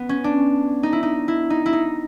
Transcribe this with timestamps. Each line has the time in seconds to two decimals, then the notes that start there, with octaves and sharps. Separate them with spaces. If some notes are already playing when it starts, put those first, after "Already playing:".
Already playing: B3
0.09 C#4
0.24 D4
0.83 D#4
0.93 E4
1.03 D#4
1.28 E4
1.50 D#4
1.66 E4
1.73 D#4